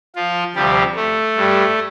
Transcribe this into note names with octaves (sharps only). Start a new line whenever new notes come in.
F3 F4
D2 C3 F3 G3 G4
A3
G2 G3